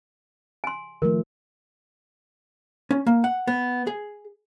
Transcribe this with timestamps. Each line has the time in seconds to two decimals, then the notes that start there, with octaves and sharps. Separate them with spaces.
0.64 G#5 C6
1.02 D#3 F3 A3 A#4
2.91 C#4
3.07 A#3
3.24 F#5
3.48 B3
3.87 G#4